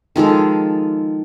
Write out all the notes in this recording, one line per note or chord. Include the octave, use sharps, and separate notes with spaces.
D#3 F3 G#3 A4